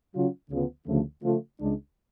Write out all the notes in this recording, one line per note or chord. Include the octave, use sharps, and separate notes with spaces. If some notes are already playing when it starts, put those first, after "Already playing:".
C#3 F#3 C#4 F4
D2 C#3 F3 B3
D2 C#3 F3 A3
C#3 F3 A3 F4
C#2 C#3 G#3 D4